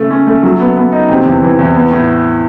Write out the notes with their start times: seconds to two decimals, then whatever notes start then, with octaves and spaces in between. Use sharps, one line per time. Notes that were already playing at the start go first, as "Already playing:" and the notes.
Already playing: C#3 A3
0.11 C#4
0.27 A3
0.43 F#3
0.60 B3
0.77 B3
0.92 D#4
1.09 C3
1.26 E2
1.42 E3
1.59 E2
1.75 B3
1.91 A2